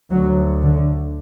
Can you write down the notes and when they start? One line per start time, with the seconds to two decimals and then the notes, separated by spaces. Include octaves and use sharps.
0.10 D2 F#3
0.62 D3